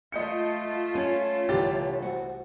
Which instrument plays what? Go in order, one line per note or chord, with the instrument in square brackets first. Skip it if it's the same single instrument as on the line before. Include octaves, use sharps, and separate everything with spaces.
[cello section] A3 F4 [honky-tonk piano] D#5 G6 C#7
[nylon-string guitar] C#4 [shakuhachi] C#5 [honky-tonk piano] D#7
[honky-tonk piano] C2 E3 A6 [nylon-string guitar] D3 G4
[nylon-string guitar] F#4 [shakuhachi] C5